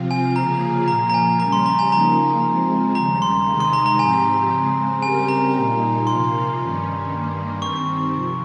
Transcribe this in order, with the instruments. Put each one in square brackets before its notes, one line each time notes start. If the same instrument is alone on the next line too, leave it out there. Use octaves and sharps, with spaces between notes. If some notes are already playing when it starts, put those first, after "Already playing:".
Already playing: [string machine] C3 F3 C4 F4
[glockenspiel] G#5
[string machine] C#3 F3 A#3 F4 G#4 [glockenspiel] A#5
[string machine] A#2 F3 A#3 [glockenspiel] A#5
[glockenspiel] A#5
G#5
[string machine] C#3 G3 C#4 [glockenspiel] A#5
[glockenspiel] C6
A#5
G#5
[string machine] C#3 F3 A#3 D#4 [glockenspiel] A#5
[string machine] F3 G#3 C4
[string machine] D#2 C#3 G3 [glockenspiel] A#5
[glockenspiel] C6
[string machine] C3 D#3 G#3 D#4
[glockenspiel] C6
A#5
A#5
[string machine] G#2 F3 C4 G4 [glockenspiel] G#5
[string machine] C#3 G#3 C4
[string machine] C#3 G3 C4 G4 A#4 [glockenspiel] G#5
[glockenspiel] A#5
[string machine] A#2 G3 A#3 D#4
[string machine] C3 F3 A#3 F4 [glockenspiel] C6
[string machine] G2 D#3 G3 C#4
G2 D#3 G3 A#3
[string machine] D#3 G3 C4 [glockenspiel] C#6
[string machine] C3 F3